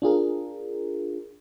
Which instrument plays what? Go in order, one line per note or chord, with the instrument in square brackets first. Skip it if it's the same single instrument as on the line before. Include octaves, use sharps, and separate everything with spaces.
[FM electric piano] D4 F4 G#4 A#4